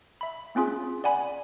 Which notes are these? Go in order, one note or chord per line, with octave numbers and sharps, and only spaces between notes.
E5 B5
A#3 C4 C#4 F4 G#4
D5 F#5 G#5 B5